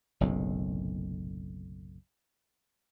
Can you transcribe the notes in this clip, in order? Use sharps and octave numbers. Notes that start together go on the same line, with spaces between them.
F#1 B1 A2 C3